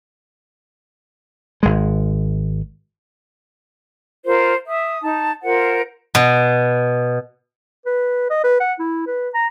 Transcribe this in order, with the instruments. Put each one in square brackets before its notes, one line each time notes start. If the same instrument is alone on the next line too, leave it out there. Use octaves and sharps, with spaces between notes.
[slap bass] G#1 G#3
[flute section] F4 A#4 C5
E5 D#6
D#4 A5
F4 A#4 C5 F#5
[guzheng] B2
[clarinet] B4
D#5
B4
F#5
E4
B4
A#5